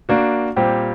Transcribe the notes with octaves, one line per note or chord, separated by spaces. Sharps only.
A#3 D4 F#4
A#2 G3 C4 G4